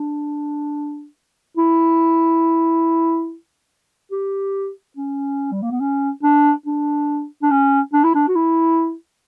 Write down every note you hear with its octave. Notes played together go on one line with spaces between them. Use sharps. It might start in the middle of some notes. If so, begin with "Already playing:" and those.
Already playing: D4
E4
G4
C#4
G3
A#3
B3
C#4
D4
D4
D4
C#4
D4
E4
D4
F#4
E4